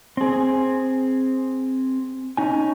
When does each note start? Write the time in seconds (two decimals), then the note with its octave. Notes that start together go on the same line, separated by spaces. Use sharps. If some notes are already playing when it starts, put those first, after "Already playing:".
0.17 C4 G#4
2.37 C#4 D#4 G#5